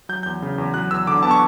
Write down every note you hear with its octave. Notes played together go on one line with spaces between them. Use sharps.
F#3 G6
E2 G6
C#3
E2
F#3 F#6
E2 E6
D3 D6
B3 A5
C#6